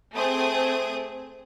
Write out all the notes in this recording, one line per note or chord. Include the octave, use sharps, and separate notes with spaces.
A3 C4 G#4 C5 D#6